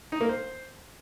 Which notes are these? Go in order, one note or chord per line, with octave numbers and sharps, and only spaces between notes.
D#4
A#3
C5